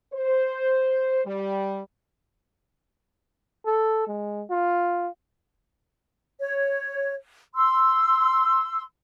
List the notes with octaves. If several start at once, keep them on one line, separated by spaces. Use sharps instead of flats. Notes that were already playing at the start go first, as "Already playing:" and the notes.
C5
G3
A4
G#3
F4
C#5
C6 E6